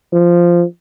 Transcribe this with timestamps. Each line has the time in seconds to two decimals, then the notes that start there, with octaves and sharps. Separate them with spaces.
0.12 F3